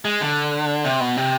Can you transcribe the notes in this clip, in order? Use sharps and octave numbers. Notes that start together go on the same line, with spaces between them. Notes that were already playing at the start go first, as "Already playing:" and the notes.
G#3
D3
C3
B2
C3